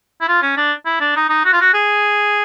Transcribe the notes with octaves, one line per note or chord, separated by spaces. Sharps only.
E4
F4
C#4
D4
E4
D4
D#4
D#4
F#4
F4
F#4
G#4